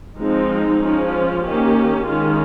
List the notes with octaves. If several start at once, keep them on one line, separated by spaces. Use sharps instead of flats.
F3 G#3 C4 D#4
F3 G#3 C#4
F4
D#3 A#3 C#4 G4
D#3 G#3 C#4 F4